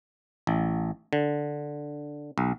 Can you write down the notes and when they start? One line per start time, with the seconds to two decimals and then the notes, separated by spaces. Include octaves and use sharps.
0.47 A1
1.13 D3
2.38 B1